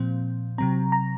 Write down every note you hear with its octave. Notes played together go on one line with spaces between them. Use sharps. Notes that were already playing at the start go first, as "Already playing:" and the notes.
Already playing: A#2 F3 C4
C3 F#3 C4 A#5
A#5